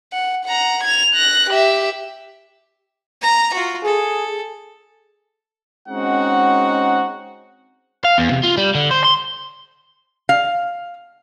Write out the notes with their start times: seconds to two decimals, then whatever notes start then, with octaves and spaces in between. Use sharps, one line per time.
0.13 F#5
0.45 F#5 A#5
0.84 G#6 F7
1.14 F#6 A#6
1.50 G4 E5
3.22 A#5
3.53 F4 F#4
3.85 G#4 A4
5.89 G#3 C4 C#4 D#4 F#4 F#5
8.05 F5
8.18 E2
8.31 C3
8.44 F4
8.57 G3
8.75 D3
8.90 C5
9.04 C6
10.29 F5